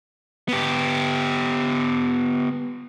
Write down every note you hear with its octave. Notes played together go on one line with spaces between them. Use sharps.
B3 G4